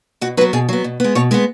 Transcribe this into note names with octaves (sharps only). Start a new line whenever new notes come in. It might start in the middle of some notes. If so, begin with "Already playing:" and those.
B2 F#4
F#3 B3 B4
B2 G#4
F#3 B3
B2
G#3 B3
B2 C#5
G#3 B3 B4